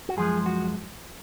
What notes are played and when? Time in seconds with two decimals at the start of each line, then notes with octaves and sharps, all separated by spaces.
0.09 F#4
0.17 F#2 F3 G#3 G#4
0.46 F#4